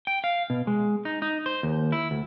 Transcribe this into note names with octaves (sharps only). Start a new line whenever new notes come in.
G5
F5
B2
G#3
D#4
D#4
C5
D#2
E4
D2